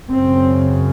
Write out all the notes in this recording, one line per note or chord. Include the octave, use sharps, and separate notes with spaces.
F#2 C#3 C4